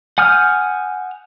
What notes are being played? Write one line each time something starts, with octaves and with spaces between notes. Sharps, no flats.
F#5 G#5 D#6 F6 G6